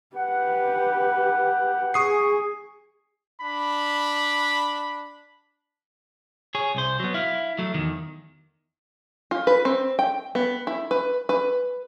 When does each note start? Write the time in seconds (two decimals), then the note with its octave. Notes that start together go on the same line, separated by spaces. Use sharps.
0.16 G4 B4 F#5
1.94 G#4 C#6 D#6 C7
3.41 D4 B5
6.55 G#4 C#5
6.75 C2 C5
7.00 F#3 B3
7.14 E4 F5
7.58 F#3 A3
7.74 E2 D#3
9.31 F4
9.47 B4
9.65 C4
9.99 G5
10.35 B3
10.67 E4
10.91 B4
11.29 B4